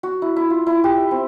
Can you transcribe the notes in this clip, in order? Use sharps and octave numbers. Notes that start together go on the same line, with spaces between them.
F#4
E4
E4
F4
E4
G4
E5
C4